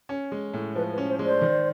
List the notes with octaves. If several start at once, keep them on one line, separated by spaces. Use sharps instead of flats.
C#4
G#3
A2
F3 B4
B4
C#4
C5
G#3
C5 D5
D#3